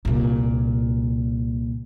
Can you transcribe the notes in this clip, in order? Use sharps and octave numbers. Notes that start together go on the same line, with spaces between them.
C2 A#2